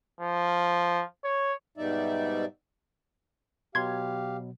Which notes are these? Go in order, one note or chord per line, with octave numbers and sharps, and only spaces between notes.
F3
C#5
G#2 B2 G3 D#4 D5 E5
B2 F#3 G4 F5 C6 G#6